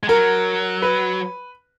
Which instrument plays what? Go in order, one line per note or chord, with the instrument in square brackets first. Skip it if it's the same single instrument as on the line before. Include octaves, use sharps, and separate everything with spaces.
[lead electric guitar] G#3
[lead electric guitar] F#3 [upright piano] A#4
[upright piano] B4